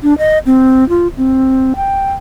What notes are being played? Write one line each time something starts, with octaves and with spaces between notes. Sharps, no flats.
D4
D#5
C4
F4
C4
G5